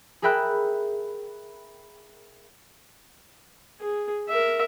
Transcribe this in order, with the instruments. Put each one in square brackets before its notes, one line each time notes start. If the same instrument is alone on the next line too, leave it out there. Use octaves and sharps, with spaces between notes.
[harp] G#4 A#4 E5 G5 B5 F#6
[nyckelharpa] G#4
A#4 E5